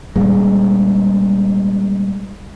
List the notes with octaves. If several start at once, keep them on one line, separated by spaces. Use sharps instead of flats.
A#2 G3 G#3